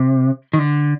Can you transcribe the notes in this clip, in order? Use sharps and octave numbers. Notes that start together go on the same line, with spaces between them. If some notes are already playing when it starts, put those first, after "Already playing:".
Already playing: C3
D#3
D3